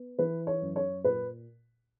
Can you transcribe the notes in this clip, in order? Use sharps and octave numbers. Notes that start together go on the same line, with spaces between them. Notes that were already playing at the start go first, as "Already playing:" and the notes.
Already playing: B3
E3 B4
C#5
F#2
C#5
A#2 B4